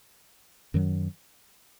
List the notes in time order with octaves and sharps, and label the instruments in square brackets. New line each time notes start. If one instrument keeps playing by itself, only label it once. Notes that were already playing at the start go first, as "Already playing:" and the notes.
[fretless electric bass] F#2 D#3 F#3